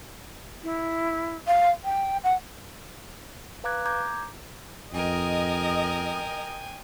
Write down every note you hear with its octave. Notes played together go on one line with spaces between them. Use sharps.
E4
F5
G5
F#5
B4 F5 A#5 D6 F#6 G#6
A#5 D6 G6 G#6
F2 A#4 D#5 G5 G#5